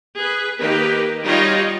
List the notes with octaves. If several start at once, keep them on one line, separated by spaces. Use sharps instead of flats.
G#4 B4
D#3 A#3 D#4 G4 B4
G3 D#4 F4 F#4 C#5 D#5